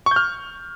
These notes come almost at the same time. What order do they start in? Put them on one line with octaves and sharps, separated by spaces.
C#6 G6 F6